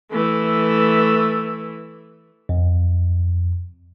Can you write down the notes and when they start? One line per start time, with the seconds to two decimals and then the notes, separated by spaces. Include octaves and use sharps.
0.11 E3 A3
2.49 F2